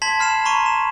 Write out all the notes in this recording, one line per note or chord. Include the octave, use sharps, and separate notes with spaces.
A5 C6 G#6 B6 F#7
B5 F6 C7 E7
A#5 C6 C#6 D#7
E7